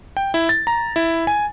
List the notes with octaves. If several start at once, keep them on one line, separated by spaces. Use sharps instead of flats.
G5
E4
A6
A#5
E4
G#5